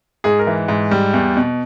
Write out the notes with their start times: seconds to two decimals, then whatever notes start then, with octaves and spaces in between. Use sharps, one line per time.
0.24 G#2 G#4
0.39 A#4
0.47 E3
0.68 G#2
0.91 G3
1.14 E2
1.36 B2